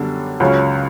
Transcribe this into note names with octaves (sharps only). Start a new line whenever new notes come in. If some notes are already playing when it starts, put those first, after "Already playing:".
Already playing: F#2 D3 G3 B3 D4
C#2 C#3 F#3 C#4